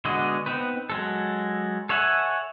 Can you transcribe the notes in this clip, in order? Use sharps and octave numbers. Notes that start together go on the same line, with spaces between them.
D3 G#3 B3 F#4 D#5
B3 C4 D#4 B4
F#3 G#3 A4
A4 C#5 E5 F#5 G#5